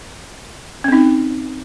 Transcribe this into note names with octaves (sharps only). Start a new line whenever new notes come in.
C4 C#4 D#4